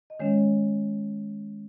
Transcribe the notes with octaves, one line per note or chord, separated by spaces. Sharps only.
D#5
D#3 G#3 C#4 C#5